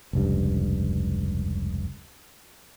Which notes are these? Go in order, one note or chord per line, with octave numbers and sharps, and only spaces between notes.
F1 C#2 G2